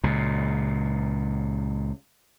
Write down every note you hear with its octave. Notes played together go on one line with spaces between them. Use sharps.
C#2 A#2